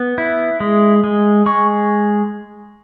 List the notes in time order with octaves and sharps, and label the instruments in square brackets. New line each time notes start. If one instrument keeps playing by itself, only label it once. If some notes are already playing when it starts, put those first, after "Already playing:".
Already playing: [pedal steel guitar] B3
E4
G#3
G#3
G#3 C#6